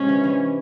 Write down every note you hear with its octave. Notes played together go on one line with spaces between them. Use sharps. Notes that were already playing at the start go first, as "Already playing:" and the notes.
Already playing: G#2 C3 G#3 C#4 D4
E3
E3